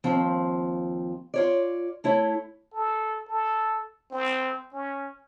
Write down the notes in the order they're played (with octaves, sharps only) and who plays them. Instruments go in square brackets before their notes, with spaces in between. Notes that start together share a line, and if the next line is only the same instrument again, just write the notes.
[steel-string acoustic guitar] D#2 F3 C4
F4 C#5 D5
A3 E4 C#5
[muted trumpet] A4
A4
C4
C#4